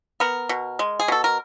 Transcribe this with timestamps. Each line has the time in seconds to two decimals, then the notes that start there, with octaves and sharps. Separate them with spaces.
0.20 B3 A#4
0.49 B2
0.79 G#3
1.00 G#4
1.08 B2 A4
1.24 A#4